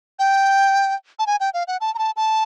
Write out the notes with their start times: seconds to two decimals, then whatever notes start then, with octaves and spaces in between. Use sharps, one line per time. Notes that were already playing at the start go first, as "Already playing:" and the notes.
0.19 G5
1.19 A5
1.27 G#5
1.40 G5
1.54 F5
1.68 F#5
1.81 A5
1.95 A#5
1.99 A5
2.17 A5